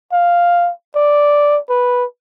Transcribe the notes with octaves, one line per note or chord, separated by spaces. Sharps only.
F5
D5
B4